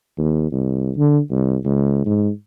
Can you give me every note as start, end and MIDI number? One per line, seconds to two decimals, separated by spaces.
0.18 0.48 39
0.52 0.91 36
0.97 1.19 50
1.31 1.56 36
1.65 2.03 37
2.06 2.29 44